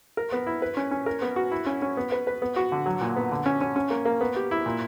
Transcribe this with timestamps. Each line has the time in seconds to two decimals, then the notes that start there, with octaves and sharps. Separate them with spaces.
0.17 A#4
0.32 B3
0.47 E4
0.62 B4
0.77 C#4
0.91 C#4
1.06 A#4
1.22 B3
1.36 F#4
1.51 E4
1.66 C#4
1.82 C#4
1.97 B3
2.12 B4
2.27 B4
2.42 B3
2.56 F#4
2.72 D3
2.86 F#3
3.01 A#2
3.16 B3
3.32 D3
3.46 C#4
3.61 C#4
3.76 C#4
3.90 A#3
4.05 A#3
4.21 B3
4.36 G4
4.51 E4
4.66 A#2